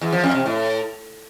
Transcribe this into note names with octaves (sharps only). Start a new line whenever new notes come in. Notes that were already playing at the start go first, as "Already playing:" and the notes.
E2
F3
F2
C3
A2